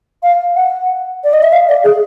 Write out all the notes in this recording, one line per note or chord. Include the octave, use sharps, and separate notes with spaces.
F5
F#5
D5
D#5
E5
F5
D5
G#4